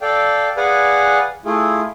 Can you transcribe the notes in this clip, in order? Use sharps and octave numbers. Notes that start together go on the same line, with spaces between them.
A4 D5 F5 G5
G#4 B4 D5 F5 F#5 G#5
A3 E4 F4 G#4